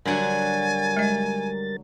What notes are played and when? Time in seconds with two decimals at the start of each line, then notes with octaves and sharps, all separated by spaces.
0.05 D3 F#3 G3 F#4 A#4 G#5 A6
0.97 G#3 D#5